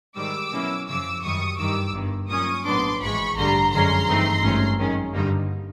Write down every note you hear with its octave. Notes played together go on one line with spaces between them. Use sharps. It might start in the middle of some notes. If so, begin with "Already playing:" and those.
G#2 D#3 G3 D6 E6
B2 F#3 A#3 C#4 E4
F#2 C#3 F3 D6 E6
F#2 D#3 G3 C#6 D#6
G2 D#3 G3 D6 E6
G1 G2 D#3
A#2 F#3 A#3 C#4 C#6 D#6
A#1 A2 F#3 B3 D4 C6 D6
G#1 G#2 E3 G#3 B5 C#6
A1 G2 D3 G3 A#5 C6
F#2 D3 F3 G#3 C#4 A#5 C6
G2 E3 A3 C4 D#4
G#1 G2 E3 A3 C#4
F#2 D#3 G#3 C#4
G2 D3 G3 A#3 D#4